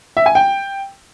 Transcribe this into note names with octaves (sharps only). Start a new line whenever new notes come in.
E5
G#5
G5